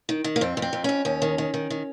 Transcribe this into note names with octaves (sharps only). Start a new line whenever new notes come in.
D#3
D#3
A#3
F2 C4
F2
C4
F2
F2 C#4
D#2 C#4
D#3
D#3
D#3
D#3